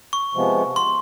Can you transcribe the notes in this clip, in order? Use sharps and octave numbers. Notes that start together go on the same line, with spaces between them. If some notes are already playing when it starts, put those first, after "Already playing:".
C#6
C3 F3 G#3 B3
C6